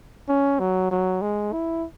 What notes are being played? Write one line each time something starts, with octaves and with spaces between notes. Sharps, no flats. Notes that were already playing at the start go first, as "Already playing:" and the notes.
C#4
F#3
F#3
G#3
E4